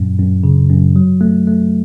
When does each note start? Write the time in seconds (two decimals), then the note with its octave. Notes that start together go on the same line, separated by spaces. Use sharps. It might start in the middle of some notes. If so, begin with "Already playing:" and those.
Already playing: F#2 A#2
0.19 F#2
0.43 C#3
0.70 F#2
0.96 F#3
1.21 A3
1.47 A3